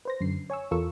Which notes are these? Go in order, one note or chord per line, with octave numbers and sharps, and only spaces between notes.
B4 C5 A#6
F#2 D3 C7
C#5 G#5 C#6 E6
E2 F4 A4 A#4 C#6 E6